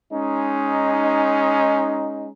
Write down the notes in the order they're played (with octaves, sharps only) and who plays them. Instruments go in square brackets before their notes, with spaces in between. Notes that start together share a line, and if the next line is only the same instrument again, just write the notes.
[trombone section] G#3 C#4 D#4